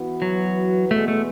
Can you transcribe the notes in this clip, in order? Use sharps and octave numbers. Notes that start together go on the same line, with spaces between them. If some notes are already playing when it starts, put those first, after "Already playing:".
Already playing: E3 B3 F#4 B4
F#3
E2 B2 G#3 A3 B3
A3